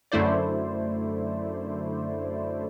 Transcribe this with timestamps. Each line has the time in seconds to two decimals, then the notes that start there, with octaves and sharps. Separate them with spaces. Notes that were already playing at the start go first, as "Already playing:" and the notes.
0.12 F#2 D3 A3 E4 C5 D5